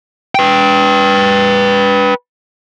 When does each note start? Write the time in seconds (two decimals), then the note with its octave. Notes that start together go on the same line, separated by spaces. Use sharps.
0.35 B4 G5